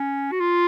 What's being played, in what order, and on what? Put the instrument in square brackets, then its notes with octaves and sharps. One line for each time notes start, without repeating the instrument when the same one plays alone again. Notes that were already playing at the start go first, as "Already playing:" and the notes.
Already playing: [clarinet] C#4
F#4
F4